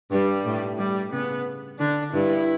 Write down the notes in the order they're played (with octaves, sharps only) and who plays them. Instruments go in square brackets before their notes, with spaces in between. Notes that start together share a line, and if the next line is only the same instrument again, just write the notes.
[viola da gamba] G2 [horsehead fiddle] G3
[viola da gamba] A2
[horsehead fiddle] G3
[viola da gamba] C#3 [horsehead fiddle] B3
[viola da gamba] D3 [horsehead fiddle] D4
[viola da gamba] G2 [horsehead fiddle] E4